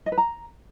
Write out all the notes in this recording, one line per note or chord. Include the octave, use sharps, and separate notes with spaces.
D#5
B4
A#5